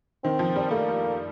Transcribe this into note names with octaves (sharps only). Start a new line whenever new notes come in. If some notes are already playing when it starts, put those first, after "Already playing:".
D#3 C4
F3
G3
A3 A#3